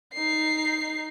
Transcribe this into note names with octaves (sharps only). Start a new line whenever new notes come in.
D#4 C7